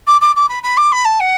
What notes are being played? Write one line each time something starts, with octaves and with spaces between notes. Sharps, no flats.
D6
D6
D6
B5
B5
D6
B5
A5
F#5